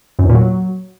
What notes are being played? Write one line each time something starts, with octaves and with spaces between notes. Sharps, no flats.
F#2
E2
A#2
F#3